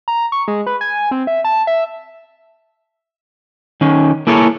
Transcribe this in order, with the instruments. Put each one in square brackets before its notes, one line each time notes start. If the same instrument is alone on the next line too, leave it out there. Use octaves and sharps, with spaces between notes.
[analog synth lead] A#5
C#6
G#3
B4
G#5
C4
E5
A5
E5
[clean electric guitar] D#3 C#4
A#3 E4 G#4 A4 C#5